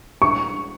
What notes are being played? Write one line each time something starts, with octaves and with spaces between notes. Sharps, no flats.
C#6